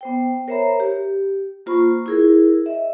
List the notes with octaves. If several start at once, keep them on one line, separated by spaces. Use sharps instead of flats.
B3 C5 G5
A#4 C5 C#5 E5 A#5 B5
G4
A#3 F4 C5 B5 C#6
E4 G#4 A#4
D#5 E5